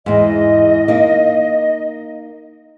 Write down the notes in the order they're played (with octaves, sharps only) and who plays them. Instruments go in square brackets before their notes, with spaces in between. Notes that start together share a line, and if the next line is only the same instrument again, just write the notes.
[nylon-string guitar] E2 G#2 [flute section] D#5
[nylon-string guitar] A#3 D#4